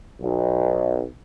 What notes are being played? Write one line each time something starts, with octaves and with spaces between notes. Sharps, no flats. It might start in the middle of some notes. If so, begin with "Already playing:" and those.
B1